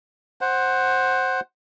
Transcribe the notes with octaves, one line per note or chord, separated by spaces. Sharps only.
C5 F#5